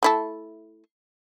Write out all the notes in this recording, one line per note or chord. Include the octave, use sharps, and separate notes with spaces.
A3 E4 A4